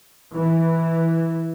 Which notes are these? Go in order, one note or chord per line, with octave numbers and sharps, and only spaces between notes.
E3